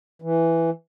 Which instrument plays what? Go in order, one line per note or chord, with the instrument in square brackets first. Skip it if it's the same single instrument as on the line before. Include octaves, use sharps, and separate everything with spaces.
[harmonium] E3